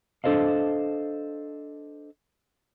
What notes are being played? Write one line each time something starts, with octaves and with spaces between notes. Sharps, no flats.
D4 A4 C5 D#5 F5